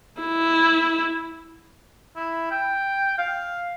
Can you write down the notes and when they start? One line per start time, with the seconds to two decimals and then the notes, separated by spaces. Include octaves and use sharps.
0.21 E4
2.16 E4
2.51 G5
3.18 F5